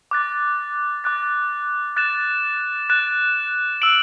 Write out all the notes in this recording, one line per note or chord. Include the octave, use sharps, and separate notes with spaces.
D6 F#6 A6
D6 F#6 A6
F#6 A6 E7
F#6 A6 E7
E6 D7 F#7